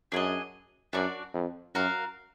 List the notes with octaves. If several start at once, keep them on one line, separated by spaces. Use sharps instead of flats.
F#2 D4 G#4 D#5
F#2 D4 F#4 D5
F2
F#2 F#4 A#4 F5